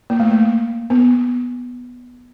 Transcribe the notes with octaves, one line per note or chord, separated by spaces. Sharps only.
A#3
A3
A#3
B3